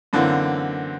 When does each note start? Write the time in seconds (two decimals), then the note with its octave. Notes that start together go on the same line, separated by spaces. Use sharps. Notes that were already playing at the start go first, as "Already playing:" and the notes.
0.13 F#2 D3 E3 A#3 C4